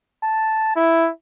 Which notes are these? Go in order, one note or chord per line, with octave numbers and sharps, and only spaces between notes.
A5
E4